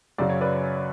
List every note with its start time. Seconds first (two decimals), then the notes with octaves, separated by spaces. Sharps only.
0.18 F#2 C#3 F#3 D5
0.30 C#5
0.41 B4 D5